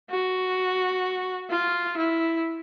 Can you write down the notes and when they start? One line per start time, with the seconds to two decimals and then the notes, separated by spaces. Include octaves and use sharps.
0.10 F#4
1.50 F4
1.97 E4